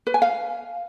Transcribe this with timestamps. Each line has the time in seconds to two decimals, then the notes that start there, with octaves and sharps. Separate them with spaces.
0.07 B4
0.14 G#5
0.22 F5